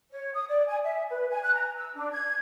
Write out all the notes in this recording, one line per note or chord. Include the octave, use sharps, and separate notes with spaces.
C#5
D#6
D5
G#5
E5
B4
G#5
F#6
A#5
E6
D4
G#6